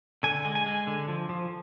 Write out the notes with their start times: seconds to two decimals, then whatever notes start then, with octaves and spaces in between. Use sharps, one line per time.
0.23 D3 G#5
0.45 G#3
0.55 G#5
0.66 G#3
0.87 D3
1.08 F3
1.29 F3